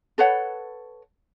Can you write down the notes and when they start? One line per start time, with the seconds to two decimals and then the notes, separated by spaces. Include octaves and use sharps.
0.18 A4 B4 C#5 F#5